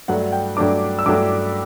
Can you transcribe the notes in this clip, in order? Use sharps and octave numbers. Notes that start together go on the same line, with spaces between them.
G2 F#3 A3 D4 F#5
G5
G2 F#3 A3 D4 D6
E6
G2 F#3 A3 D4 D6